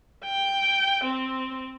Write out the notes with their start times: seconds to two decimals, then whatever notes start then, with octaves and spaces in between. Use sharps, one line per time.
0.25 G5
1.04 C4